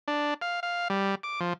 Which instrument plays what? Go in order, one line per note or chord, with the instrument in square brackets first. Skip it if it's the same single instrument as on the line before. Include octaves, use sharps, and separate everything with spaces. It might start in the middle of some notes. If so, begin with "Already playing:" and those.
[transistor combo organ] D4
F5
F5
G3
D6
F3